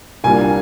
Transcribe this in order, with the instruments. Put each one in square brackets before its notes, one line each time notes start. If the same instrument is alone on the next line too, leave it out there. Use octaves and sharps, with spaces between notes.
[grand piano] C2 A#2 G3 A#3 D4 G#5